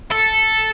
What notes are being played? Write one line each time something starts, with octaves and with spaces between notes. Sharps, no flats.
A4